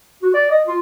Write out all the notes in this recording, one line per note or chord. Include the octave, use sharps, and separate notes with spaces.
F#4
D5
D#5
F4